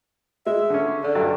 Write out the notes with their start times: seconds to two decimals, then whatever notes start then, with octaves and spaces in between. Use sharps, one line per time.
0.46 G#3 E5
0.70 D3 C#4
1.03 D3
1.15 G2 F#3 D5